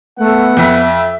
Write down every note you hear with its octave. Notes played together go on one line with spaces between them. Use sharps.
A3 B3 F#5
F2 E5 B6